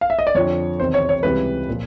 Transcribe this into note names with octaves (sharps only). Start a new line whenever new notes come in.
F5
E5
D#5
D5
F2 D3 F3 C#5
E2 C3 D#3 C5
C#5
C#5
C#2 C3 E3 G3 B4
A#2 F3